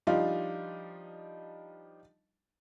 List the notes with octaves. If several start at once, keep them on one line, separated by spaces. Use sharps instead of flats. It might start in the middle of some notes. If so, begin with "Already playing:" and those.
F3 G3 D4 D#4 F4